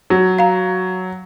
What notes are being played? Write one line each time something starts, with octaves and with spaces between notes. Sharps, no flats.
F#3
F5 A#5